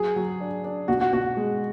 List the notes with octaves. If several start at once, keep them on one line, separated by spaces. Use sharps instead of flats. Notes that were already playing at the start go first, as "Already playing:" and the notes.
Already playing: F#3 G#4
F#3
D4
D4
B2 F#4
F#4
B2 F#4
G#3